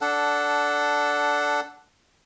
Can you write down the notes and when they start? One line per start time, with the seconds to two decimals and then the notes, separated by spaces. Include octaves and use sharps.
0.01 D4 A4 F#5